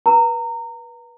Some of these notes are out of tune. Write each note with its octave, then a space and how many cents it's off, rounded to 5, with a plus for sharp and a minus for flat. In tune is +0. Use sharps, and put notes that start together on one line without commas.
B4 -30 A#5 -25